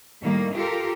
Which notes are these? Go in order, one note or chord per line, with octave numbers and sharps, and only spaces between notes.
A2 D#3 G3 A#3
F4 G4 A4 A#4